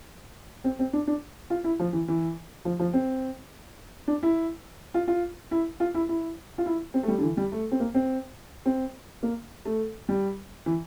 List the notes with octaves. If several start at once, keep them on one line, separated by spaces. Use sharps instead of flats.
C4
C4
D4
D4
F4
E4
F3
E3
E3
F3
F3
C4
D4
E4
F4
F4
E4
F4
E4
E4
F4
E4
C4
A3
G3
D3
E3
G3
A3
C4
A#3
C4
C4
A#3
A3
G3
E3